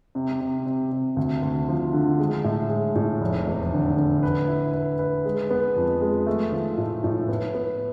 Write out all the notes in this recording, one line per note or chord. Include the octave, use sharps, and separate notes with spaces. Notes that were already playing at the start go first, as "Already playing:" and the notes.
C3
C3
C3
C3
D2
D2
F3
D3
G#3
A2
G#3
A2
F1
E2
D3
D3
B4
E4
B4
B4
G#3
B3
F2
G#3
A3
F3
A2
A2
B3
B3